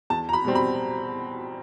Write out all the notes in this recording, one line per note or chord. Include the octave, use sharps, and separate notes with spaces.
E2 A5
A#5
B5
B2 G3 C4
B5